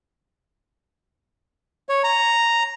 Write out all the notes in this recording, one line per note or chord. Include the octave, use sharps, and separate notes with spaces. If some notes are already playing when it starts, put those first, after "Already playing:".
C#5
A#5